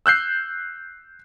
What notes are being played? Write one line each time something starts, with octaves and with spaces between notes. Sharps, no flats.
E6 F#6 G6 C7